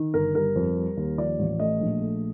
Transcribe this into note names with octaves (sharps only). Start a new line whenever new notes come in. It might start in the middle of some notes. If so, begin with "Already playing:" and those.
Already playing: D#3
G1 A#4
G3 A#4
F2
G3
D#2
F3 D5
A1
A3 D#5
A#1
A3